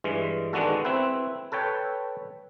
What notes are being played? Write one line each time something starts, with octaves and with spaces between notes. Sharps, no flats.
G2 E3 G#3
D#3 G#3 B3 D4 F#4 A4
C4 E4 B4
A4 B4 C#5 G5